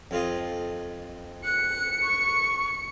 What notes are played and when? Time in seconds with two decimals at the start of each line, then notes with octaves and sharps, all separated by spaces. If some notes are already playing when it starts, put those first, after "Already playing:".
0.11 F2 F4 D#5
1.45 F#6 C#7
2.03 C#6